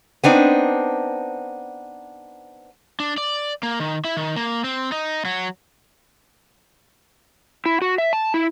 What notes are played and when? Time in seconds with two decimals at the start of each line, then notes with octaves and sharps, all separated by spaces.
0.24 B3 C4 D4 D#4
3.00 D4
3.18 D5
3.63 A#3
3.80 D#3
4.05 E4
4.17 D#3
4.36 A#3
4.64 C4
4.92 D#4
5.25 F#3
7.66 E4
7.82 F#4
7.98 E5
8.13 A5
8.34 E4